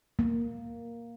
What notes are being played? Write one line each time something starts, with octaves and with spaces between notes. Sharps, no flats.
A#3